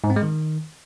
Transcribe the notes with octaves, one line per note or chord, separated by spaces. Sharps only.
G#2
C4
G#3
D#3